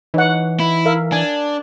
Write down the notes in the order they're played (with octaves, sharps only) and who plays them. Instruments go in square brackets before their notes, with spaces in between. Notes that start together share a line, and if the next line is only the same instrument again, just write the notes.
[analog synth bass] E3 [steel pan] D#4 C#5 F#5
[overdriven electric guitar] E4
[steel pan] A#4 E5 F5
[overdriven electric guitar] D4 [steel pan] G#5